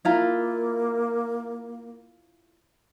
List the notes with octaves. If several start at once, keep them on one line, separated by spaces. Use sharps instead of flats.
A#3 E4 F4 A#5